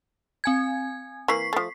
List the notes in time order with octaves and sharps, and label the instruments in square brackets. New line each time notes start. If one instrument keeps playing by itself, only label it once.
[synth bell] C4 G#5 G#6
[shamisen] E3 A#3 [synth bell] C#6 B6 C7
[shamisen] F3 A3